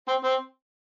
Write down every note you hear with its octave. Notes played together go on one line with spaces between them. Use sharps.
C4
C4